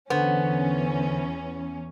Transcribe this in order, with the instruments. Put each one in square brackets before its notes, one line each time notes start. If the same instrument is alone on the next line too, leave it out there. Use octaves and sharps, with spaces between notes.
[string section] E2 C#4 [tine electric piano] D3 C5 [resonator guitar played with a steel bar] B3